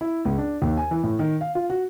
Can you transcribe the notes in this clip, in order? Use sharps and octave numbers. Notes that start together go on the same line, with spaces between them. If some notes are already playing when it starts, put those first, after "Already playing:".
E4
C#2
D4
D#2
G#5
E3
A2
D#3
F5
F4
F#4